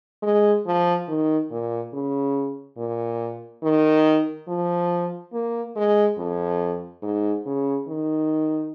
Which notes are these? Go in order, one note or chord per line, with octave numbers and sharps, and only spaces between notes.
G#3
F3
D#3
A#2
C#3
A#2
D#3
F3
A#3
G#3
F2
G#2
C#3
D#3